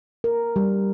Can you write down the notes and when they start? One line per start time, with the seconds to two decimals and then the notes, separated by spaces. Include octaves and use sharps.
0.24 A#4
0.56 G3